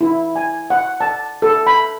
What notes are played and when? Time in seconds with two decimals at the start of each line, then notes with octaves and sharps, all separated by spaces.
0.01 E4
0.36 G#5
0.70 F#5
1.01 A5
1.42 A4
1.67 B5